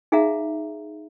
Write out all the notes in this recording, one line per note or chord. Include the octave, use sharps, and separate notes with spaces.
D#4 G#4 E5 F5 A#5